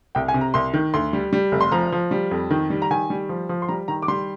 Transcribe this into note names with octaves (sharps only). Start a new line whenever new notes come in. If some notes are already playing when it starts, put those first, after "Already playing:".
C2 G5
G#5
C3
A#5
C2 C6
D#3
D2 C6
G3
G3
F1
C6
F3 A#5
F3
G3
F2
D#3
G3
A#5
D#3 G#5
G3
F3
F3
C6
G3 A#5
D#3 A#5
D6
G3 C6